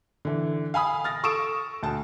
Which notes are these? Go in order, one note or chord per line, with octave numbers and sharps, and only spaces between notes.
D3 E3
F5 G#5 B5 D#6
F6 A6 A#6
A4 C#6 D#6 E6 D7 E7
D2 A5